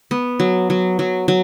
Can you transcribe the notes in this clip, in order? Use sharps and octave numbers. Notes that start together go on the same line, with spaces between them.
B3
F#3
F#3
F#3
F#3